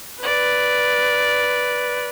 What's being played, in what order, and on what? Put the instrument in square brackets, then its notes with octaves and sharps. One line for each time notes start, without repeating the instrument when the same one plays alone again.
[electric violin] B4 [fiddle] D5